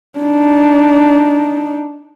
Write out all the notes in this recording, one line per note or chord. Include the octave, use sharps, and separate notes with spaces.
D4 D#4